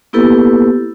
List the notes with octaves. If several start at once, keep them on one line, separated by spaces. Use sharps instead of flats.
A#3 B3 E4 G4 A4 B4